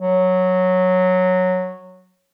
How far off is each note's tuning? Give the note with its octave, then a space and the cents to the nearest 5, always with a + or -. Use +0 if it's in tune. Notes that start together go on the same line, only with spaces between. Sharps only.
F#3 -10